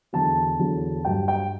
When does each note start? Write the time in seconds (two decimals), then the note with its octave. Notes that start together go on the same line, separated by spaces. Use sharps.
0.13 E2 D3 F#3 A5
0.59 E2 D3 F#3
1.05 G2 F#3 G5
1.28 G5